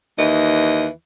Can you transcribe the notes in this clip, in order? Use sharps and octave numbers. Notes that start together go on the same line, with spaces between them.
D#2 E3 D#5